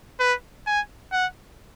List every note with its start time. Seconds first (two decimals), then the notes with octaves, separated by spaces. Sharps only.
0.20 B4
0.67 G#5
1.13 F#5